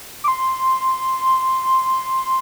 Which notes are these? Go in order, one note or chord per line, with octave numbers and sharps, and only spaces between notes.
D6
C6